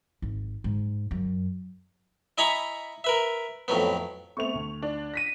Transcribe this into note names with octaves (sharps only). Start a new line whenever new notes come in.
G#1
G#2
F#2
E4 D#5 G#5 A#5 B5 C#6
A#4 B4 E5
F2 A2 F#3 B3
A3 B3 C4 C#6 F7
D2
D4
A#6 B6 D#7